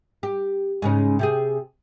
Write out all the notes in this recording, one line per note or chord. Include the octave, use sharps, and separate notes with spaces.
G4
G#2 C#3 C#4
C3 G4 G#4